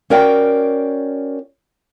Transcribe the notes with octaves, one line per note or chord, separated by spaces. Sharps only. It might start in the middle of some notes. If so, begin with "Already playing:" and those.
C#4 F#4 A#4 D5 F5 G5